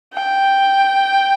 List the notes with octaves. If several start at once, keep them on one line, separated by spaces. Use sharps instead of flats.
G5